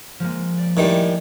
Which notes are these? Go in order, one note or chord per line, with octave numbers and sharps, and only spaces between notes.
F3 G#3 A#3
D5
A2 D#3 G3 G#3 C#7 E7